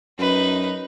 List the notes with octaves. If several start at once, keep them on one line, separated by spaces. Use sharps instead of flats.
F#2 D#4 B4